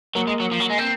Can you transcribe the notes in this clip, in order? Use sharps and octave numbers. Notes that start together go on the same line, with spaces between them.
F#3 A#3
G#3
F#3
F3
F#3
G#3
C4